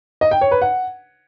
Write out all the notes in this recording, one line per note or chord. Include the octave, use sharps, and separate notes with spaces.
D#5
G5
C#5
B4
F#5